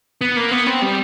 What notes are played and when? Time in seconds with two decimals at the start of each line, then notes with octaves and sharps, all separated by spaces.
0.21 B3
0.37 A#3
0.51 B3
0.67 C4
0.82 G3